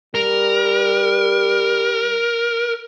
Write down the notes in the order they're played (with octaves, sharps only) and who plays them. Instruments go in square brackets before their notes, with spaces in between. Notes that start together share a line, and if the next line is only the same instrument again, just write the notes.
[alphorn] G3 [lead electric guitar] A#4